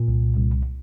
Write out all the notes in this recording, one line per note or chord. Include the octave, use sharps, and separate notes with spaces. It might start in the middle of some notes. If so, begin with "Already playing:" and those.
Already playing: A#2
C2
C2